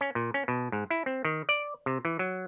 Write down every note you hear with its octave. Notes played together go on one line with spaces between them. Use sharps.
C#4
A#2
C#4
B2
G#2
E4
C4
D#3
D5
C3
E3
F#3